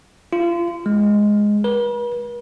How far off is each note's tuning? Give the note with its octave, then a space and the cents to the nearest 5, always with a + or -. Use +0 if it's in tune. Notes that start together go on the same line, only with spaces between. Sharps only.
F4 -30
G#3 +0
B4 -45